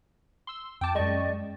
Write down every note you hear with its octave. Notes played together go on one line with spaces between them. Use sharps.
C6 E6
F2 G5 A5 D6
F#2 G3 G#3 D5 D#5 C#6